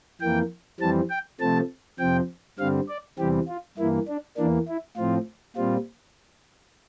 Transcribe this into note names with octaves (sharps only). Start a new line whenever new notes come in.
F2 E3 A#3 G5
F2 E3 G3 C4 A5
G5
C3 F3 A3 C4 A5
F2 C3 F3 C4 G5
G2 D3 G3 C4 F5
D5
E2 C3 E3 G3 C4 G4
F4
G2 E3 A#3 E4
D4
E2 E3 A#3 D4
E4
A2 F3 C4 F4
A#2 G3 C4 F4